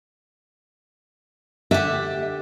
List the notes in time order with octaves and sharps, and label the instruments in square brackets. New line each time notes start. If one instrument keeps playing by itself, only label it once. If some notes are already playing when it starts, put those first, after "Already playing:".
[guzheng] D3 G4 [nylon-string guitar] E5